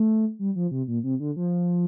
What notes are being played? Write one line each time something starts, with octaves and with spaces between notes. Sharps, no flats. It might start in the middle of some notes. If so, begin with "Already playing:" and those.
Already playing: A3
G3
F3
C3
A#2
C3
D3
F3